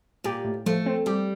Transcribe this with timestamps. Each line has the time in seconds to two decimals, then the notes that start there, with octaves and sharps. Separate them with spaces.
0.24 A#2 G4
0.45 A2
0.66 F3 A3
0.86 C4
1.06 G3 G4